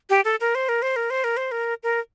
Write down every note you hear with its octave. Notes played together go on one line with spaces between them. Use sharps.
G4
A4
A#4
C5
A#4
C5
A#4
C5
A#4
C5
A#4
A#4